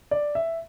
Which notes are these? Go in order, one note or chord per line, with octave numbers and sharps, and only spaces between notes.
D5
E5